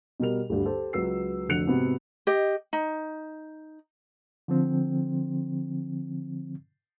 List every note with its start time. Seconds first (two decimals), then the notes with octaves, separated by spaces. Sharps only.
0.20 B2 G3 A#4 F7
0.49 D2 G2 D3 G3
0.66 G4 A4 C5
0.93 C#2 F#3 B4 E6 C7
1.49 F1 D3 F#4 F#6 C#7 F7
1.67 G#2 C3 B3 F#4
2.27 G4 D#5
2.73 D#4
4.48 D3 F3 C4